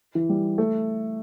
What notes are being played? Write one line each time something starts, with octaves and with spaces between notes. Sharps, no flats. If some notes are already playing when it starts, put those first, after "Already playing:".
E3
G3
A3